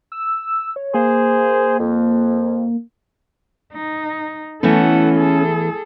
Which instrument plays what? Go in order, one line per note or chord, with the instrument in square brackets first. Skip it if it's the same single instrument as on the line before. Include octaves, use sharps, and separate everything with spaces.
[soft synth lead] E6
C#5
[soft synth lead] A#3 [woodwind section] G#4 C5
[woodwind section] F2
[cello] D#4
[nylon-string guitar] E3 A3 B3 [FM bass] C#4 [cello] A4 F#5
[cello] G#4 A4